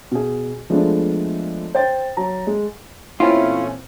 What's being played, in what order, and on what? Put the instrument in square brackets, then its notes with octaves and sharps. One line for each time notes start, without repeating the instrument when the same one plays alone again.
[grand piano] B2 G#4
F3 G#3 A3 B3 D4
C5 G5 A6
F#3 A#5
G#3
[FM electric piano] A#2 E3 C4 [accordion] A3 C#4 [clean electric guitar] E4 [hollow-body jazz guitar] F4